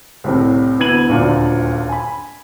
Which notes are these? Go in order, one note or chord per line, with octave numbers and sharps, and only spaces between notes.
C2 A2 C3
D2 B3 E4 G#6 D#7 F#7
D#1 D2 G2 A#2
G#5 B5